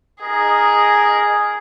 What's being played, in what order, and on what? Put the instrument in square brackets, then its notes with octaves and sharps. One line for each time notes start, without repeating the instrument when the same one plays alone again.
[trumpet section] D#4 A#4 D#5 [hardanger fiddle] G#4